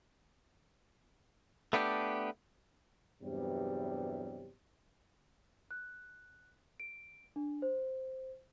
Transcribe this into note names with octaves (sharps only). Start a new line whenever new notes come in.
A3 B3 D4 G4
E2 G2 C3 F#3 G3
F#6
D7
D4
C5